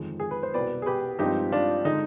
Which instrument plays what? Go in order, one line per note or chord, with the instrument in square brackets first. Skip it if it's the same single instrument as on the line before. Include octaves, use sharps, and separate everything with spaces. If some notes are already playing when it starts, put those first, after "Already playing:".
Already playing: [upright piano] G1 F2 D#3 G#3
G#4
B4
C5
C2 B2 B3 B4 D5
G#4
G4 B4
G2 F3 G#3 C4 D#4 G4
D4 F4
D3 G#3 D#4